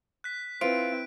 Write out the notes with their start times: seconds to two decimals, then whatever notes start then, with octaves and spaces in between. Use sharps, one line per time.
0.24 F#6 B6
0.61 C4 E4 F4 B4 C5 D7